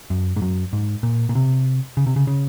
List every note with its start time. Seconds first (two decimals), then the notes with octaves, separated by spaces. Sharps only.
0.10 F#2
0.36 G#2
0.42 F#2
0.73 G#2
1.03 A#2
1.29 A#2
1.35 C3
1.97 C#3
2.07 C3
2.16 C#3
2.27 C#3